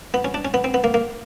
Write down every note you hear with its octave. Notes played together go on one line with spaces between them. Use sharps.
B3
C#4
D4
C#4
B3
C4
B3
A#3
A#3